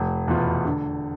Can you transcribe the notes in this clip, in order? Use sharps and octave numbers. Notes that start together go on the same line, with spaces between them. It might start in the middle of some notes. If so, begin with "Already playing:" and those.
Already playing: F1
E2 B2 B3 F4
D3